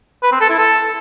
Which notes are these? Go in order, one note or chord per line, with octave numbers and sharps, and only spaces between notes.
B4
C4
A4
E4
A4